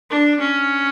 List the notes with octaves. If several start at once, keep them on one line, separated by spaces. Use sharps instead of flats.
D4
C#4